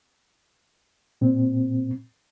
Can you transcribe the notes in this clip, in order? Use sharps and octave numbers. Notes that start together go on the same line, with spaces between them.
A#2 C4